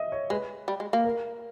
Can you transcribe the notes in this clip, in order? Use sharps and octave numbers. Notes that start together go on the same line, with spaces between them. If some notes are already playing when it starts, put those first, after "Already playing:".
Already playing: D#5 E5
C#5
G#3 B4
G3
G#3
A#3
A#4